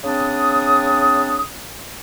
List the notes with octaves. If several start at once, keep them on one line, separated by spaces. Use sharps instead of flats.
C#3 C4 D4 D#6